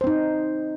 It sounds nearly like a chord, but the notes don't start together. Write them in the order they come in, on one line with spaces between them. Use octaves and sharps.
C5 C4 D#4